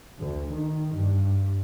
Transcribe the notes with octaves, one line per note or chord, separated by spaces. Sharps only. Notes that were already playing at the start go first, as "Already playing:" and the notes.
D2
D#3
G2